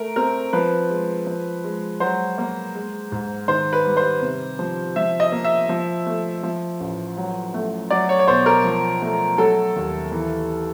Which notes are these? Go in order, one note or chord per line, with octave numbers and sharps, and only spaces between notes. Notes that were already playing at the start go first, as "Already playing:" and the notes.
Already playing: A3 A#4
C4 A#4
F3 B4
G#3
F3
G#3
F#3 C5
A#3
G#3
G#2
D#3 C5
B4
G3
C5
C3
F3
F3 E5
D#5
A#3
E5
F3
A3
F3
A1
F#3
A3
F#3 D5
C#5
C#5
B1 C5
A#4
F3
A3
F#3 A4
D#2
E3